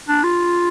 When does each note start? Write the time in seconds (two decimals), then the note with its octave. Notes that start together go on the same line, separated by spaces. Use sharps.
0.09 D4
0.24 F4